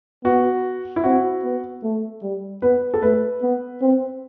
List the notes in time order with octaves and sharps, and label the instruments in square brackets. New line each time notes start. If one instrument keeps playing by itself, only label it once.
[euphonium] B3 [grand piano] F#4
[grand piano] E4
[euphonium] C4 [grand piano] F#4
[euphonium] B3
A3
G3
[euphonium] B3 [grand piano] B4
[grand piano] A4
[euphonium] A3 [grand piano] B4
[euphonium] B3
C4